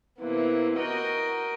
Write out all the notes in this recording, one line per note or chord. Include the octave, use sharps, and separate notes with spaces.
C3 E3 A#3 B3
F#4 A#4 D#5 G5